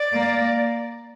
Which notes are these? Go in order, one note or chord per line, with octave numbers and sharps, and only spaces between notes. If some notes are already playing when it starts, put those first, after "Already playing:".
Already playing: D5
A#3